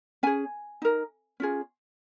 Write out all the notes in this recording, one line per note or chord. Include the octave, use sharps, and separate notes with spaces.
C#4 G#4 G#5
D#4 A#4
C#4 F4 G#4